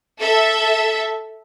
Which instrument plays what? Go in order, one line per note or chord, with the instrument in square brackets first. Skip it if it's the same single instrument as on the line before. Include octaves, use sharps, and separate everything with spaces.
[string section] A4 E5